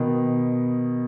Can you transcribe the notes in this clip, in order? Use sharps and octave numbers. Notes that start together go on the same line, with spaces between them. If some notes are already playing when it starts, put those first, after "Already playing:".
Already playing: B2 D#3